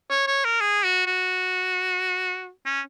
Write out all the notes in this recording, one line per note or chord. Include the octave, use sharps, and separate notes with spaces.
C#5
C#5
A#4
G#4
F#4
F#4
C#4